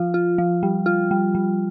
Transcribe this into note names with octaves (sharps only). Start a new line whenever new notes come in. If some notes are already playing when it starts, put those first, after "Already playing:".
Already playing: F3 F4
F4
F3
G3
F4
G3
G3